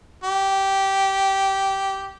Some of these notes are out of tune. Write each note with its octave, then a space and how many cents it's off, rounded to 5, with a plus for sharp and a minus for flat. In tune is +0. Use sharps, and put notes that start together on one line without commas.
G4 -10